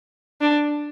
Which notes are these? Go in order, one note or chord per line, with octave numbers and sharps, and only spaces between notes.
D4